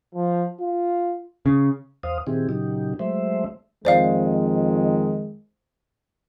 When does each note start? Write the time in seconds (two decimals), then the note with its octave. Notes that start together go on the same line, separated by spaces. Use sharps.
0.15 F3
0.60 F4
1.46 C#3
2.03 E2 C5 F5 D#6
2.27 A#2 D#3 C4 E4 G4 G#4
2.49 A#2 C#3 F#3 D#4 G4
2.99 F#3 G#3 A3 C5 E5
3.85 F2 D#3 G#3 C5 D5 F5